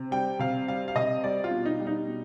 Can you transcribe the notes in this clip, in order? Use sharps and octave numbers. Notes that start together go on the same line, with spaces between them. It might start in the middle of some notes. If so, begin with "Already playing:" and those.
Already playing: C3
G3 G5
C3 F5
G3 F5
F5
C3 D#5
G3 D5
F4
B2
D#4
G3
D#4
B2